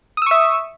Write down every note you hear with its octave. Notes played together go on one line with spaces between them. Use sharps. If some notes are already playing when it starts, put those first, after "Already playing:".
E5 C#6 D#6 E6